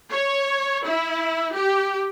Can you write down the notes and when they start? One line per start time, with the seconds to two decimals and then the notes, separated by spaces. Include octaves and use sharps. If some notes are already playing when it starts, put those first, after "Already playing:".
0.12 C#5
0.85 E4
1.54 G4